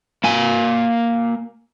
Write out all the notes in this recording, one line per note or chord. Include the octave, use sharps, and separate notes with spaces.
A#3 G#5